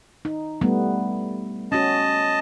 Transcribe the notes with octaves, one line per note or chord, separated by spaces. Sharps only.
D#4
G3 A3 B3
C#4 F#4 D#5 A5